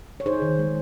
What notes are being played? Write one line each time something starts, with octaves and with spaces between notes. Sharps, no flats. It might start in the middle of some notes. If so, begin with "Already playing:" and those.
C#5
D#4 G#4 C5
D#3
G#3